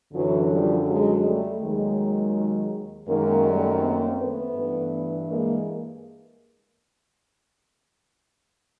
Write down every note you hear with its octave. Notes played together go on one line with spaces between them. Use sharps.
F#2 D3 E3 F#3
F3 G3
F#3 G#3
G3 A3
D#2 D#3 F#3 G#3
F#2 D#3 G#3 A#3
G3 A3
A#3 C4
A3 B3
G2 E3
G#3 A#3